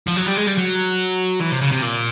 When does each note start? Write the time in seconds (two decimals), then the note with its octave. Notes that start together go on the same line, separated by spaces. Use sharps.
0.08 F3
0.17 F#3
0.27 G3
0.37 G#3
0.48 G3
0.58 F#3
1.40 E3
1.52 C3
1.61 C#3
1.71 C3
1.82 A#2